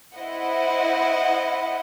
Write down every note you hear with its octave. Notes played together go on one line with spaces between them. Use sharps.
E4 C5 D#5 F#5